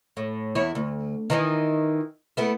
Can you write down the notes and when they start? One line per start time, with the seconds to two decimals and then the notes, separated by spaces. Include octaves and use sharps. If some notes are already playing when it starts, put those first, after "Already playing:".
0.17 A2
0.55 E2 E4 C#5
0.75 D2
1.30 D#3 E3 D#4
2.37 A3 B3 E4